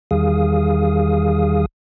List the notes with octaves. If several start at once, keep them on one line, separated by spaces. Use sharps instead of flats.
E2 D#3 G3 G#4 F5 D#6